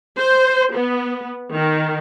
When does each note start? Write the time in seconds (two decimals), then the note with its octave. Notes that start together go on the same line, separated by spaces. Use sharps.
0.18 C5
0.74 B3
1.52 D#3